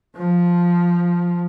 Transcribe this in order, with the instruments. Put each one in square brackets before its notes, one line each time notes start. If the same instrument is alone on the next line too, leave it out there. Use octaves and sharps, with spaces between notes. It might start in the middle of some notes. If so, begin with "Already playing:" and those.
[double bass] F3